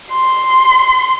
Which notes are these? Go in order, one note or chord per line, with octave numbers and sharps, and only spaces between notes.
C6